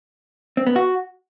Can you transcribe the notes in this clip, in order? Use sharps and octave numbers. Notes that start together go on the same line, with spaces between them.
C4
B3
F#4